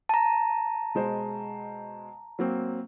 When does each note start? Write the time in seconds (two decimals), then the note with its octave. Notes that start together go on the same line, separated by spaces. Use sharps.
0.09 A5 A#5
0.95 B2 G#3 C5
2.39 F#3 A#3 C4